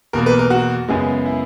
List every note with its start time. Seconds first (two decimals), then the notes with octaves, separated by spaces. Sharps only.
0.13 E2 B2 A#3 A#4
0.26 B4
0.39 A#4
0.50 F#4
0.89 F#2 C#3 G#3 B3
1.25 E4